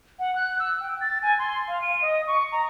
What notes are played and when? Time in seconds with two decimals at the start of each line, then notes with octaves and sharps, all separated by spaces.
0.19 F#5
0.36 F#6
0.60 E6
0.80 G5
1.01 A6
1.22 G#5
1.39 C6
1.68 F5
1.82 D#7
2.02 D#5
2.27 C#6
2.52 A#5